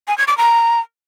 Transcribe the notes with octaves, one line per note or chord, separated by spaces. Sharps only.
G#5
G#6
D6
A#5